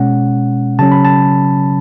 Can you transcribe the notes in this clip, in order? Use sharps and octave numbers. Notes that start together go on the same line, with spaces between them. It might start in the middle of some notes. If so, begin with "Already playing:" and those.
Already playing: B2 G#3 C#4 F#5
C#3 F#3 C#4 A5
B5
A5